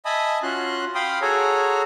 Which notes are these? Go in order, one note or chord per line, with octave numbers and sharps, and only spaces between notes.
D#5 E5 G#5 A5 B5 D#6
C#4 F4 F#4 C6 F#6
F5 G5 B5 C6 D#6
F#4 G#4 A4 C#5 G#5 A#5